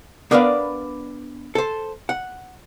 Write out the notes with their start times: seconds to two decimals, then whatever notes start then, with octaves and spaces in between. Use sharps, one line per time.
0.31 B3 D4 A#4 B4 D5 F5
1.55 A4 C5
2.09 F#5